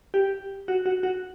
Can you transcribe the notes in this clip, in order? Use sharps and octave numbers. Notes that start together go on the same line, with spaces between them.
G4
F#4
F#4
F#4